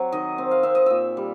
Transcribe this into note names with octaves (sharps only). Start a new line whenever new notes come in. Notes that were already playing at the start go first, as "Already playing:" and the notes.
Already playing: F#3 C4
D#3 D#5
C4
F5
C4 E5
D#5
A#2 E5
G3